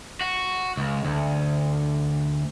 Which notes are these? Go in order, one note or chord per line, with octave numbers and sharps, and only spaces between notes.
F#4
C#2
D2